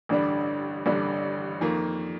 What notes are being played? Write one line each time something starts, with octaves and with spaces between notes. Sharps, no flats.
A1 G2 D3 G3 D4
A1 G2 D3 G3 D4
F2 D#3 A#3 F4